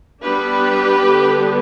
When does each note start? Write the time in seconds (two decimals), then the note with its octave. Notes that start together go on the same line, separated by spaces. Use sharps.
0.23 G3 B3 D4 G4 B4
1.07 D3 G3 B3